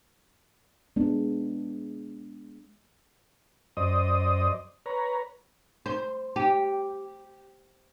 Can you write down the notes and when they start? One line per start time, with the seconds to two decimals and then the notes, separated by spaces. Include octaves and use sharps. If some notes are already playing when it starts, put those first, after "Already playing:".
0.96 G#3 B3 D4
3.77 F#2 C5 D5 D#5 D#6
4.86 B4 C#5 A#5
5.86 C5
6.36 G4